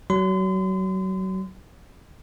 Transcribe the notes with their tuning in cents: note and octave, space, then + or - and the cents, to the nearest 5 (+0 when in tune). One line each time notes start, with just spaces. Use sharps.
F#3 +30 C6 -40